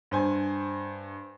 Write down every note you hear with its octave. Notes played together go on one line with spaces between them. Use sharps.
G2 C5 G#5